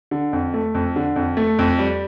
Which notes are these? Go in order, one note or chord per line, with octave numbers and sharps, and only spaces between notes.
D3
F2
A3
F2
D3
F2
A3
F2
G3